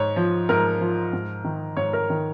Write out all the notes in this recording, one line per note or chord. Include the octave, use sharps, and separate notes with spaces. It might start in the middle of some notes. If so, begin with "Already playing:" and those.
Already playing: G#2 C#5
F3
G#2 A#4
F3
G#2
D#3
G#2 C#5
A#4
D#3